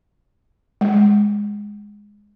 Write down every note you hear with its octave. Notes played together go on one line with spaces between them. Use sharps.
G#3